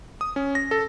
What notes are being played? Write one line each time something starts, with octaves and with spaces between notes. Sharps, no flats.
D#6
C#4
A#6
A4